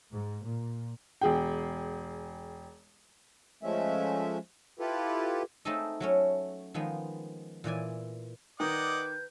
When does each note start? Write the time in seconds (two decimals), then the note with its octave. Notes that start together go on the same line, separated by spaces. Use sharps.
0.12 G#2
0.43 A#2
1.21 E1 G#4 G5
3.63 F3 G#3 A3 C#4 E5
4.79 E4 F4 G4 A4 B4
5.65 A3 C4 D#4 G#4 A4 D#5
6.00 F#3 A3 C#4
6.74 D#3 F3 G#3 B3
7.64 A#2 E3 D5 G#5
8.60 D#3 B4 D5 D#5 F#5 D6 G6